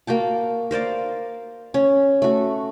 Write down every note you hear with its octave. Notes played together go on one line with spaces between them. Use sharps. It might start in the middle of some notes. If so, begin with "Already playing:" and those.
A#3 F#4 G5 A5
A#4 C5 D5 F5
C#4
A3 F#4